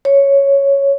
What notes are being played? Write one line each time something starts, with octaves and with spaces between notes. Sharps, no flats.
C#5